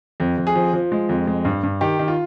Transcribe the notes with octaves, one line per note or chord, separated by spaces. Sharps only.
F2
F2
G#4
F3
F3
G#3
F2
G#3
G2
G2
D#3 G4
D#3
F4